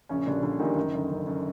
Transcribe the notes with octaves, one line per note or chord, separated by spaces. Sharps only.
A#1 C#3 C#4
A#2 D3 G3 D4
A#1 D3 D4
A#2 D#3 G3 D#4
F#1
F#2 D3
F#1
F#2 D3